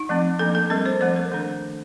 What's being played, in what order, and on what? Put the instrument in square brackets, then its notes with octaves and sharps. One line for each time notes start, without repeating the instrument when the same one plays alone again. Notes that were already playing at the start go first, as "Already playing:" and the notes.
Already playing: [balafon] D#4
F3 A3 C4
F3 A#3 D4 A4
A4
G3 C4 A#4
C5
F3 A3 C4 C5
A#4
D#3 A3 D4 A4